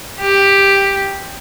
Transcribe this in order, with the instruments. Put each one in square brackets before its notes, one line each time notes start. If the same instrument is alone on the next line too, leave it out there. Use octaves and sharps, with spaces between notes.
[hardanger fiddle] G4